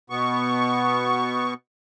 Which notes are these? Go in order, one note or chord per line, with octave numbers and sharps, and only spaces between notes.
B2 B3 C#6